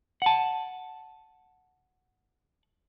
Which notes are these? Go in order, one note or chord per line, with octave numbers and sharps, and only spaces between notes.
F#5 A5